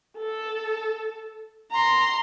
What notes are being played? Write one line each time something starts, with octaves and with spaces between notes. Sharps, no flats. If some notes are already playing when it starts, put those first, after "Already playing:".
A4
A#5 C6